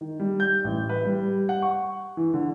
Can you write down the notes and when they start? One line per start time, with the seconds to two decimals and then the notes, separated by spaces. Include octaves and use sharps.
0.01 D#3
0.20 G3
0.40 G6
0.64 A1
0.89 B4
1.05 G3
1.49 F#5
1.62 C#6
2.17 E3
2.34 D3